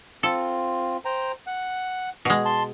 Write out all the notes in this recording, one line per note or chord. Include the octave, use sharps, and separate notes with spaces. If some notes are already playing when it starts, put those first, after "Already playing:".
C4 F4 A4
C5 G5 A#5
F#5
B2 G#3
A5 C6